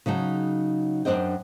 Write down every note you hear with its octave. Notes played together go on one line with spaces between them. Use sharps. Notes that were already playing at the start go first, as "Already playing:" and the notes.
C#3 F#3 D#4 A5
F#2 E3 D4 C5 D#5 G5